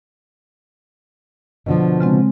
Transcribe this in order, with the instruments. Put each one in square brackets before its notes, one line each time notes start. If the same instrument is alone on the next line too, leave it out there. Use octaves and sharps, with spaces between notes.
[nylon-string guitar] B2 D3 F3
[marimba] C#3 G#3 C4